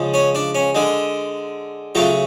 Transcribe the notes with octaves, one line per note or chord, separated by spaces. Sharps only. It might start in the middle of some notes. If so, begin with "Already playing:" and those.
Already playing: C#3 F3 G#3
C#4
D4
C#4
D3 G#3
C#3 F#3 A3 F4